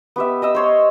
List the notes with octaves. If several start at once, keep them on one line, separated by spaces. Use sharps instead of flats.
B3 G4 E5
D#5 D#6 E6
C5 C#5 C6